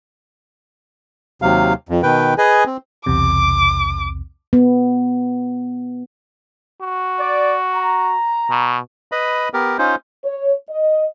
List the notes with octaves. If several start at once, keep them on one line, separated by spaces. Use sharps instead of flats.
D#2 C3 F#3 F5
F2
B2 D#3 B4 G5
G#4 B4 D#5 G#5
C4
B1 E2 C3 D6
B3
F#4
D5
A#5
B2
B4 D#5 B5
B3 G4 A#4
C#4 D#4 F4 C5
C#5
D#5